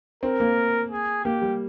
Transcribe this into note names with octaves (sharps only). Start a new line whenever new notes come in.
C4 A#4
A#3
G#4
A#3 G4
G3